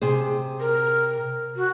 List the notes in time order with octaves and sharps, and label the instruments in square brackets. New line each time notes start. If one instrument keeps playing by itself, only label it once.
[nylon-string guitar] C3 G#4 C5
[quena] A#4
F#4